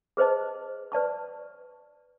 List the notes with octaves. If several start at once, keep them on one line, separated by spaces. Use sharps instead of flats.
G#4 B4 C5 D#5 A5
B4 D5 A5 C#6